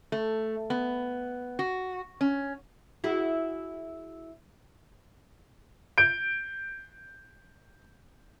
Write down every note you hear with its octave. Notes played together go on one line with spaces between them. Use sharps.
A3
B3
F#4
C#4
E4 F#4 G#4
G6 D7